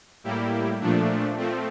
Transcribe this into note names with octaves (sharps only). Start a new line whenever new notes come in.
A2 G3 A#3 E4 G4
A#2 F3 A3 D4
F3 A3 C4